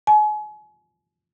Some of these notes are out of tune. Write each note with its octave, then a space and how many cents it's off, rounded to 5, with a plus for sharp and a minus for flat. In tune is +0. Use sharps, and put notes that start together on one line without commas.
G#5 +35